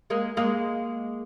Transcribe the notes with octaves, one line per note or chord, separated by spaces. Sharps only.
G#3 A#3
G#3 A#3